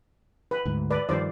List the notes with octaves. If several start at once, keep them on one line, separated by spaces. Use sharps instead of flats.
B4
D2 G#2
B4 D5
G2 D#3 F3 C5 D5